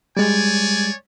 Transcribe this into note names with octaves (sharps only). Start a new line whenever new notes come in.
G3 G#3 C#5 D5 G#5